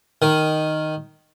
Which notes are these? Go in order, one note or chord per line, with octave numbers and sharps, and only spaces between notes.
D#3